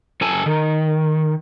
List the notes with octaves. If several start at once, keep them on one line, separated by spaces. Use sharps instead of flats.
F#2 A4 G#5 A5
D#3